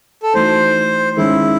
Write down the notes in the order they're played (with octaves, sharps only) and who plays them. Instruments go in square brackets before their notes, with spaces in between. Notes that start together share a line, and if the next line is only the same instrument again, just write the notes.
[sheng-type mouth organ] A4
[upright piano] E3 A3 D#4 F#4 [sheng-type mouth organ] C5
[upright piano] D#3 G#3 C#4 [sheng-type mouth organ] E4